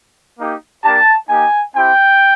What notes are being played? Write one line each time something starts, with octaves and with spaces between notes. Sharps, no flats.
A#3 D#4 G4
A#3 D4 G4 A5
A#3 D#4 G4 G#5
C4 E4 G4 G5